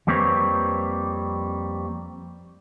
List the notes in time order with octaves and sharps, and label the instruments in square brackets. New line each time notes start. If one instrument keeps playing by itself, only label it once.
[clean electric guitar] F2 G3 A#3 C4 B4 C#5